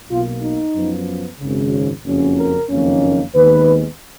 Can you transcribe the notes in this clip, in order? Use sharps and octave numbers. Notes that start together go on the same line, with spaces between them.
B1 B2 A#3 F4
D#4
F#2 F3 B3
G#1 F#2 C#3
F#1 F2 C#3 F#3 C#4
A#4
F#1 F2 D#3 A#3 C#4
D#2 D#3 G#3 B3 B4